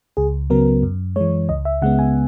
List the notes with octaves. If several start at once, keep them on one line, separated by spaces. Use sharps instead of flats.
C#2 G#4
C#3 F#3 B3 A#4
F#2
E3 G#3 C#5
C#2 D#5
E5
C#3 G#3 B3 F#5
G#5